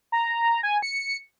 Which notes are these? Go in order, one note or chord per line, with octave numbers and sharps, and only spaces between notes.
A#5
G#5
C#7